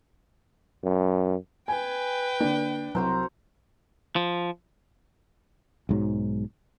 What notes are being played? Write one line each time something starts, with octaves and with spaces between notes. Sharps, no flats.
F#2
B4 G5 G#5
D3 A#3 D4
C2 F#3 F#4 C5 A#5
F3
B1 G#2 F#3